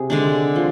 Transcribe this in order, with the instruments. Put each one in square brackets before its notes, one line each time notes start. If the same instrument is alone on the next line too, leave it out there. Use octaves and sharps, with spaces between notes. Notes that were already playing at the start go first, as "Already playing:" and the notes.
Already playing: [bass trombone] C3 [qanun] G#4
[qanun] D3 G#3 D4
F3